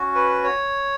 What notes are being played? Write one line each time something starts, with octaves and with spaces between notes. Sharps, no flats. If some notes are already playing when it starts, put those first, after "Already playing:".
Already playing: C#4 F#4
B4
C#5